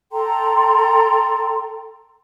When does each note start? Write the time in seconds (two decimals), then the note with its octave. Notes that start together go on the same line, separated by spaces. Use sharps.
0.13 A4 G5 A#5 C6